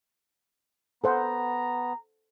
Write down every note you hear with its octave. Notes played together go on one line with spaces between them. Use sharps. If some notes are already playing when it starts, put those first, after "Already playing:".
B3 A4 C5 F#5 A#5